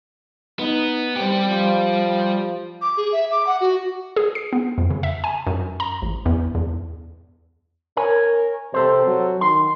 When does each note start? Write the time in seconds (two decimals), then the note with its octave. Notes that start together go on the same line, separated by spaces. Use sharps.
0.59 B3 D#4
1.16 C2 C3 G3 G4
1.47 F3
2.82 D6
2.97 G#4
3.12 E5
3.31 D6
3.47 F#5
3.61 F#4
4.16 G#4
4.35 C7
4.53 B3
4.78 F2
4.90 C#3
5.03 E5
5.24 G#5
5.47 F#2
5.80 A#5
6.02 A1
6.25 E2
6.55 E2
7.97 A#4 C#5 G#5
8.74 C3 A4 C5
9.07 F#3
9.41 D#3 C6